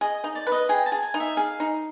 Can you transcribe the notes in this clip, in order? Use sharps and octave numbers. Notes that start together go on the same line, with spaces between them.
G#4 D#5
D#4
D5
B4
D#5
G#4 G5
A5
G#4
G#5
D#4
E5
G#4 F5
D#4